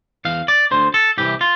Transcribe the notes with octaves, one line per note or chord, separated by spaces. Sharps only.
E2 E3 F5
D5
D2 D3 C5
A4
C2 C3 E3 G4
F4